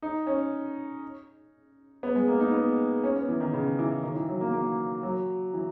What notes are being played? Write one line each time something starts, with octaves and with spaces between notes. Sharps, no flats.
D#4
C#4
B3
G#3
A#3
D#4
B3
C#4
B3
E3
D#3
C#3
E3
D#3
E3
F#3
A#3
A#3
F#3
E3